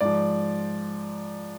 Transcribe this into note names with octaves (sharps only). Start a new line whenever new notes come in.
G#2 F3 D5